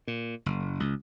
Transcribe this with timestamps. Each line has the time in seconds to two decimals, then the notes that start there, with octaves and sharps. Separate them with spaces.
0.07 A#2
0.46 F#1
0.80 C#2